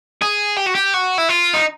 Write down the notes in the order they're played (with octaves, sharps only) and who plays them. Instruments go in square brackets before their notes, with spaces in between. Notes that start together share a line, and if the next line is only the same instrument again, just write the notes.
[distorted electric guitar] G#4
G4
F#4
G4
F#4
E4
F4
D#4